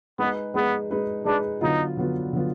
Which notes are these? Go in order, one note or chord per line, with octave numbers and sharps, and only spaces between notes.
G#3 B3 D#4 G#4 B4
G#3 B3 D#4 G#4 B4
G#3 D#4 G#4 B4
G#3 D4 D#4 G#4 B4
D3 F#3 B3 D#4 F4
D3 F#3 B3 F4
D3 F#3 B3 F4